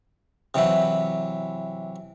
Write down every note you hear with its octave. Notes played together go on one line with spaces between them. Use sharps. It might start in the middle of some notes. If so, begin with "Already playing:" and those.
C3 E3 F#3 E4